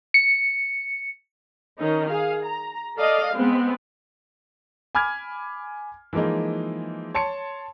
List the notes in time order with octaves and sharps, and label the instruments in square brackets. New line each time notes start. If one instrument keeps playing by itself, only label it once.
[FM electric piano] C#7
[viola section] D#3 C#4 D#4
G#4 F5
A#5
A4 D5 D#5 F5
G#3 B3 C4
[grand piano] G#5 B5 D6 F6 G#6
E3 F3 G#3 A#3 D#4
C#5 A5 C6 C#7